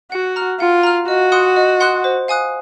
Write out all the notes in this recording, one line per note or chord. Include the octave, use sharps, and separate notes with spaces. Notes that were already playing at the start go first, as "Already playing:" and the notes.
F#4 F#5
A#5 F6
F4 F#5
A#5 F6
F#4 D#5
F#5 C6 D#6 F#6
D#5
F#5 C6 D#6 F#6
C5
F5 G#5 D#6 F#6